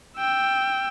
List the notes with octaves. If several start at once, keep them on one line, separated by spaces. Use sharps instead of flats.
G5 E6